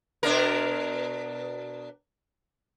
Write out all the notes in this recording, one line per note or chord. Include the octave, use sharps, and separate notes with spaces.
B2 D4 A#4